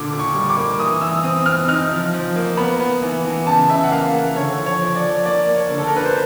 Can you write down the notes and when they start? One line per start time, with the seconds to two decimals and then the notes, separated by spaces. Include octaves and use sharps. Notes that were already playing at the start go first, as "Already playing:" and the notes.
Already playing: A#2 D3 D6
0.12 D3
0.19 C#6
0.35 G3
0.49 D6
0.57 A#3
0.80 E3 D#6
1.01 E3 E6
1.23 C4 D#6
1.46 C4 F6
1.68 D#4 F6
1.91 F3
2.14 F3
2.36 A#3
2.57 B3 B5
2.80 B3
3.02 E3
3.25 E3
3.47 C#3 A5
3.69 C#3 E5
3.84 F#5
3.91 A#3 F5
4.14 A#3 F#5
4.36 D3 C#5
4.59 F3
4.66 C#5
4.81 F3
4.96 D5
5.03 F3
5.25 A#3 D5
5.48 A#3
5.56 C#5
5.70 D3
5.78 A4
5.87 A#4
5.93 D4 B4
6.05 C5